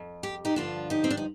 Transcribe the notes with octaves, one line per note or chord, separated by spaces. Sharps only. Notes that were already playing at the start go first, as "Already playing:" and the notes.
Already playing: F2
G4
D#4 G4
G2 D3 F3 D4 F4
D#4 G4
C4
D4
D#4